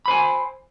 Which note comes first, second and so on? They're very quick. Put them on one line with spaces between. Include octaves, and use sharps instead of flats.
B5 C5 G#5